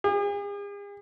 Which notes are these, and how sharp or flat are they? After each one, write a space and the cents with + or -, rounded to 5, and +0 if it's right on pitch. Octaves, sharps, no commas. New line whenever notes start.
G#4 -45